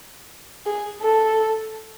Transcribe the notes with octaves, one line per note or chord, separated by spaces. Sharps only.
G#4
A4